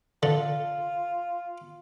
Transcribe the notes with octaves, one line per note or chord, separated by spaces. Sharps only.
D3 F4